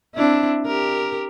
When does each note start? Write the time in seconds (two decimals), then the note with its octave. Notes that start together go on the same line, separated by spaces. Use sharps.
0.15 C4 D4 E4
0.66 G4 A#4